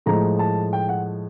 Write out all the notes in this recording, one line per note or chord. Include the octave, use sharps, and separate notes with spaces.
A2 F3 G#3 A#5
A5
G5
F#5